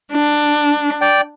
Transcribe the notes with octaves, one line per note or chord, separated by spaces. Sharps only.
D4
D5 G5